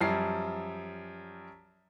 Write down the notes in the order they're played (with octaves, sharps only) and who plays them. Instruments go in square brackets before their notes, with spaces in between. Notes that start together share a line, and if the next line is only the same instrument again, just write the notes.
[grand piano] F#2 F3 G3 C7